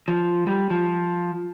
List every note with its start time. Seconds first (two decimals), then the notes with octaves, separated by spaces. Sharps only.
0.08 F3
0.47 G3
0.70 F3